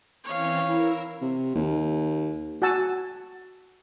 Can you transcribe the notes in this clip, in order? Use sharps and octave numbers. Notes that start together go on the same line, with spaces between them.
E3 C4 C#4 C#5 F5
E4 A#4 E6
C3
D#2
F#4 F#5 G#5 A5 E6